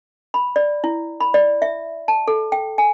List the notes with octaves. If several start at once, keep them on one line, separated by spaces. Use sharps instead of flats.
B5
D5
E4
B5
D5
E5
A5
A4
G5
G#5